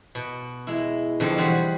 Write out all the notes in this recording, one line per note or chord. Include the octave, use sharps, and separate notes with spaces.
B2
G#3 E4
F2 B2 D3 C4 D#4
E2 G3 F#4 C5